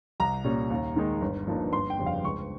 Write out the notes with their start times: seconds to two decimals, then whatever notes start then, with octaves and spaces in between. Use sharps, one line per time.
0.20 C2 A#5
0.44 A#2 G3 C#4
0.70 D#2
0.96 D#3 G#3 D#4
1.22 G1
1.47 G2 F3 A#3 D#4
1.72 G1 C6
1.90 G5
1.99 F2 C#3 G3
2.06 F5
2.23 C#2 C#6